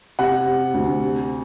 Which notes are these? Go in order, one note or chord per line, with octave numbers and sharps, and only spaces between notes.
C3 F#5
C3
D2
C3